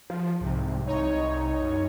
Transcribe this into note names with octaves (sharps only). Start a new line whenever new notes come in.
F3
C2 G#2 C3
C2 D#4 C#5
F#2